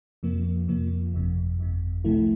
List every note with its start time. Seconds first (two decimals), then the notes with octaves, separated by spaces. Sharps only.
0.23 F2 C3 F3 A#3
0.68 F2 C3 F3 A#3
1.14 G1 F2 C3
1.59 G1 F2 C3
2.04 C2 C3 F3 A3 E4